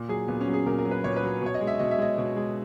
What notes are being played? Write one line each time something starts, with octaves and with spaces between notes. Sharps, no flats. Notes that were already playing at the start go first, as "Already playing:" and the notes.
Already playing: A#2
F#3 G#4
A#2 B3
C#4
F#3
G#4
A#2 A#4
A#4
F#3
B4
A#2 C#5
B4
F#3
B2 C#5
D#5
G#3
E5
B2 D#5
E5
G#3 D#5
B2
G#3